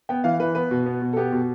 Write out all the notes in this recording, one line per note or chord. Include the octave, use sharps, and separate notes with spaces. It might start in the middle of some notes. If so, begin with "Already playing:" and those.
B3 G5
E3 F5
E3 B4
B3 B4
B2
B3
B2
A4
B3 G4
B2